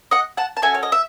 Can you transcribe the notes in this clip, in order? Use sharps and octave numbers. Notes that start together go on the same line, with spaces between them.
D#5 F#5
F#5 A5
A5
C#4 F#4 A4 E5 G#5
C#5
D#5
E5